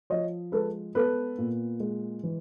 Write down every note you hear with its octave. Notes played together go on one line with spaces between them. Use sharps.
F3 C#5 D#5
G#3 A4 B4
B3 A4 B4
A#2
G#3
E3